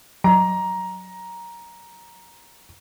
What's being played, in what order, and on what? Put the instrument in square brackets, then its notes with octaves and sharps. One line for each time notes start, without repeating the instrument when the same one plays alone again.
[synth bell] F#3 [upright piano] A#5